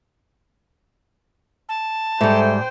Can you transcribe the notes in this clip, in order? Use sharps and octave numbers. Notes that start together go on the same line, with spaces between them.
A5
G#2 G3 A3 C5 G5